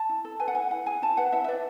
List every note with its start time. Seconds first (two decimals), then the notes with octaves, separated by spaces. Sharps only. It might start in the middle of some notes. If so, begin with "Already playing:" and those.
Already playing: A5
0.09 E4
0.25 A4
0.40 B4 G#5
0.48 F#5
0.55 E4 G#5
0.70 E4 F#5
0.86 G#4 G#5
1.02 E4 A5
1.17 B4 F#5
1.32 E4 E5
1.44 E5
1.48 B4 D5